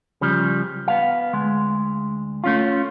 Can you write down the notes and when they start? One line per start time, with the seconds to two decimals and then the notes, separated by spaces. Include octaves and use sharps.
0.21 C#3 F3 G3
0.88 B3 F5
1.33 D2 G#3
2.44 A3 C#4 F4